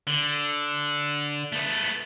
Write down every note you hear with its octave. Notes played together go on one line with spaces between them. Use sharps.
D3
A3 B3